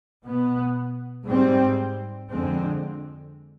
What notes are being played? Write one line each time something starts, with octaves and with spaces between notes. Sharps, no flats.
B2 B3
G#2 G3 C4
F2 D3 G#3 C4